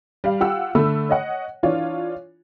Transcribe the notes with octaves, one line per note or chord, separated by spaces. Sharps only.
G3 F5
F4 G4 F#5 E6
D3 A3 B5 E6
C#5 D#5 F#5
E3 D4 F4 C#5